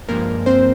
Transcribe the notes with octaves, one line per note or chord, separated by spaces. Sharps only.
G2 F3 G#3 A#3 A#4
C4 C5